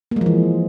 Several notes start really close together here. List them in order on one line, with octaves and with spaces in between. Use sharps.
A#3 G#3 F3 E3